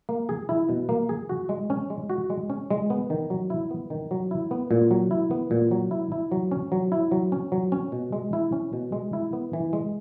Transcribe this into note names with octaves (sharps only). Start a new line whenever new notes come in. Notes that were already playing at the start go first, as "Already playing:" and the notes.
A#3
G#4
E4
B2
A#3
G#4
F#4
G#3
C#4
G#3
F#4
G#3
C#4
G#3
B3
D#3
F#3
E4
B3
D#3
F#3
E4
B3
A#2
F#3
E4
B3
A#2
F#3
E4
E4
F#3
C#4
F#3
E4
F#3
C#4
F#3
C#4
B2
G#3
E4
C#4
B2
G#3
E4
B3
E3
G#3